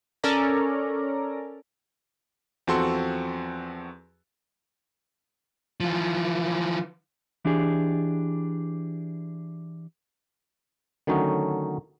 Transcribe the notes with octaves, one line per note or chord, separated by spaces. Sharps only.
C#4 A4 A#4 D5 A#5
E2 F3 C4 F#4 A4 C6
E3 F3
E3 D4 G4 G#4
D3 D#3 F#3 A3 C#4 D#4